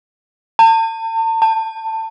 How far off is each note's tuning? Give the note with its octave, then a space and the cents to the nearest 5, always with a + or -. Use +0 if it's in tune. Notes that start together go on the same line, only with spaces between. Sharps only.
A5 +40
A5 +20